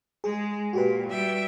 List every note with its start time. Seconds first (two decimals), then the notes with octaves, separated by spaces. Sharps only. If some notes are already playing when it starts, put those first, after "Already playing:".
0.24 G#3 G#4
0.73 A#2 F#4 G4 B4
1.09 G3 E5 G5